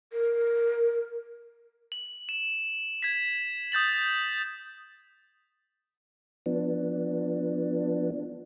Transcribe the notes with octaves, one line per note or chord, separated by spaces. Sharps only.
A#4
F#7
E7
G#6 B6
D#6 G6 A6 F#7
F3 B3 D4